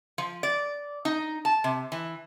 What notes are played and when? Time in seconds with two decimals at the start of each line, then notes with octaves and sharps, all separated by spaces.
0.18 F3
0.43 D5
1.05 D#4
1.45 A5
1.64 C3
1.92 E3